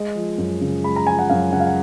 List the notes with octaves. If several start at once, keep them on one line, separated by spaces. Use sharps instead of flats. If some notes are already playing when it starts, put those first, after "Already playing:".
Already playing: G#3 D#5
F3
F#2
C#3
G#3 B5
A#5
F3 G#5
F#5
F#2 F5
C#3 F#5
F5
F#5